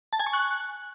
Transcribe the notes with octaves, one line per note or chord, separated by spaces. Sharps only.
A5
G#5
C#6
F#6